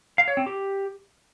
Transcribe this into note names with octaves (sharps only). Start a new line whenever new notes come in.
F5
C#5
C4
G4